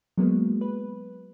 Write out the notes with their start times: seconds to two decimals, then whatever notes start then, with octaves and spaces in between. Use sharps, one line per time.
0.18 F#3 G#3 A#3 B3
0.61 B4